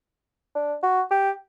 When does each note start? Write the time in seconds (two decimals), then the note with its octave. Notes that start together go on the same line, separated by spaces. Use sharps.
0.55 D4
0.83 F#4
1.11 G4